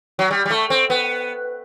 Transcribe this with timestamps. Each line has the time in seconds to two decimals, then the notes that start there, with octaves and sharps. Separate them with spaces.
0.19 F#3
0.31 G3
0.46 G3
0.51 A3
0.70 C4
0.90 B3